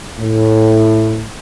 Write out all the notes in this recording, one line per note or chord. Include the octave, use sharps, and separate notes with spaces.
A2